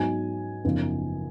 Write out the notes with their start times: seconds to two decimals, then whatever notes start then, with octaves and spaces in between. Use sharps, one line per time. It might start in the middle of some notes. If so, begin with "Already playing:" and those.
Already playing: G#2 F#3 B3 D#4 G#5
0.64 F#1 F#2 F3 B3 D#4